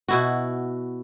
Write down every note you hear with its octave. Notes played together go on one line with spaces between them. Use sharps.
B2 E4 F#4